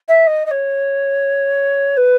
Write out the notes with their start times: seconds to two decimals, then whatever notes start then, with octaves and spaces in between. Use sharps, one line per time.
0.08 E5
0.27 D#5
0.46 D#5
0.51 C#5
1.97 B4